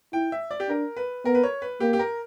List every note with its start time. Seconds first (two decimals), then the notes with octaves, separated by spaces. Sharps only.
0.13 E4 G5
0.32 E5
0.51 D5
0.60 G4
0.69 D4 A#4
0.97 B4
1.25 B3 A#4
1.35 B4
1.43 C#5
1.62 B4
1.80 A#3 G4
1.93 G4
1.99 A#4